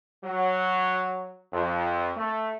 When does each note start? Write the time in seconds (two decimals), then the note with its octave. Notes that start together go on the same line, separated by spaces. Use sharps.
0.24 F#3
1.53 F2
2.16 A3